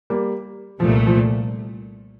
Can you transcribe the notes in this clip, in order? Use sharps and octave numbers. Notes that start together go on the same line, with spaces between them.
G3 A#3
C2 A#2 F3 A3
F3